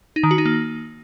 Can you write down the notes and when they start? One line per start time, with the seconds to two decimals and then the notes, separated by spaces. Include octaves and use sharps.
0.16 D#4
0.23 D#3
0.31 F#4
0.38 D#4
0.46 A#3